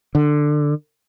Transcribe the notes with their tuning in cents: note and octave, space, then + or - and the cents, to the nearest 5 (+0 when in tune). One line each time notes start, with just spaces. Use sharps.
D3 +15